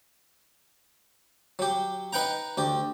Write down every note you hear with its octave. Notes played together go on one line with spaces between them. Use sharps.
F#3 G4
D#4 B4 F#5 G5 A#5
D2 G4